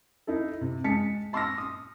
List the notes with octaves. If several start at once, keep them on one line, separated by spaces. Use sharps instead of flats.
D#4 E4 A4
C3
G#3 A5 B6 C#7
A5 C6 D6 E6 F6 A#6
D#6